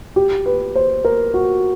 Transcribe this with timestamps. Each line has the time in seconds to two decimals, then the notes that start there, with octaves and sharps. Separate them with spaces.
0.16 G4
0.46 B4
0.75 C5
1.05 A#4
1.34 F#4